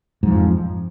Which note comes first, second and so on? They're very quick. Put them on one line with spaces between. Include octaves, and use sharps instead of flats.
G#2 F3 F2